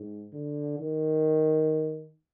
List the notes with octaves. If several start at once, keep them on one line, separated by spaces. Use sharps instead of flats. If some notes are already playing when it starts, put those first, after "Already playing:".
Already playing: G#2
D3
D#3